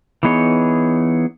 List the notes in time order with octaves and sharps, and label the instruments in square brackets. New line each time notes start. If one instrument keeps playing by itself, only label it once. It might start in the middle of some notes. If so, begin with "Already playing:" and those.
[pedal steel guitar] E3 B3 D#4 G#4 C#5